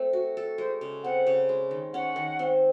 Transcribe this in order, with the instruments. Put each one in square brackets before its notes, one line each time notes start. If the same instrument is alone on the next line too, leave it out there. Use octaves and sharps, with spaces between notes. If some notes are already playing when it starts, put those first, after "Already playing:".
Already playing: [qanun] A3 C4
F#4
A4
[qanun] G#3 [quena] C5
[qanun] C#3
[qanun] C4 [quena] F#5
[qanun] C#3
G#3
D#3
[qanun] C#4 [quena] F#5
[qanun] D#3
C4